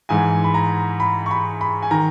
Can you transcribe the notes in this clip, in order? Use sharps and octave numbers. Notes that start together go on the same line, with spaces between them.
G#2 E3 G#5
B5
A#5
B5
C#6
B5
B5
G#5
D#3 A#5